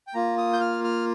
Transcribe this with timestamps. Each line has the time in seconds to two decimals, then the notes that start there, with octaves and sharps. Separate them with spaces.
0.07 G5
0.14 A#3 F4 A#5
0.38 D#6
0.53 G6
0.60 F6
0.84 F6